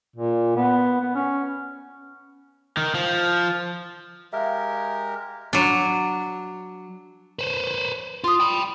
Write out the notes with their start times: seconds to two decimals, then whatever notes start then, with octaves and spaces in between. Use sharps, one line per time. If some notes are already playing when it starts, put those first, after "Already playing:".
0.16 A#2
0.57 B3
1.01 B3
1.15 C#4
2.77 D#3
2.95 F3
4.33 G#3 G4 A#4 E5 F5
5.53 F#3 D4
7.39 B4 C5
8.24 F4 C6 D#6
8.40 G5 B5